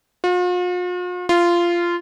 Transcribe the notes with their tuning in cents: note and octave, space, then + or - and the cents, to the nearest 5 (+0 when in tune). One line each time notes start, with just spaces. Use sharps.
F4 +45
F4 -15